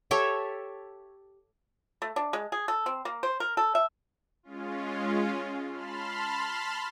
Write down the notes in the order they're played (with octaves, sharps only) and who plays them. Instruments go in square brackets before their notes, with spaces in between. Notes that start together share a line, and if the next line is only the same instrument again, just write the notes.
[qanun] G4 A4 C#5 E5
[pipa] A3
D4
G#3
G#4
A4
C4
A#3
C5
A#4
A4
E5
[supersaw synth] G#3 C#4 F4
A5 B5 C6 F6